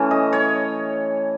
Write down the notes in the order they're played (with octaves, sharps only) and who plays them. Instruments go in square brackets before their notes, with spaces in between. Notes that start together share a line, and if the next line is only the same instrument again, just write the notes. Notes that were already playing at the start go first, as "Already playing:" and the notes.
Already playing: [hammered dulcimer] E3 A3 C#4
D#5
C#5